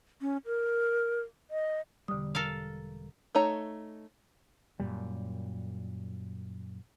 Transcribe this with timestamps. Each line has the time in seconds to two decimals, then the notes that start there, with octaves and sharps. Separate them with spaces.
0.21 C#4
0.46 A#4
1.51 D#5
2.08 E1 D3 G3 D#6
2.35 A4 A#4 F5
3.35 A3 D#4 C#5 A#5
4.80 F#2 A#2 G3